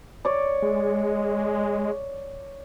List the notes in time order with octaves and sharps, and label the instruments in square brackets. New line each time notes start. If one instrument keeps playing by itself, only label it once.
[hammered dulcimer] C#5 D5
[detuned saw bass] G#3